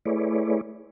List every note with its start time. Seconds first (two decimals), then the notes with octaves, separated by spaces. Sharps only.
0.06 A3 E4 G#4 B4 C#5 D5